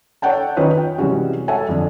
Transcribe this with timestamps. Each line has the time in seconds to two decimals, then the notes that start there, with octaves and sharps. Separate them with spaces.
0.22 A4 C#5 D5 F#5 G5 A5
0.56 D#3 C#4 D#4 F4 B4 C#5
0.78 G5
0.98 C3 E3 G3 G#3 C#4 F#4
1.48 A4 C#5 E5 F#5 G#5 A5
1.69 F2 D3